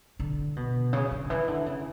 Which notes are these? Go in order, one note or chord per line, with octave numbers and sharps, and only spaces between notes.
D3
B2
C#3
D3
E3
D3
C#3